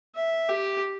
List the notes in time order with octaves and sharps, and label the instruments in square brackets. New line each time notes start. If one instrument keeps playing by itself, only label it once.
[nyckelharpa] E5
G4